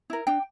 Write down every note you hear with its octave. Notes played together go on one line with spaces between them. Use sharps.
E4 A#4
D4 G5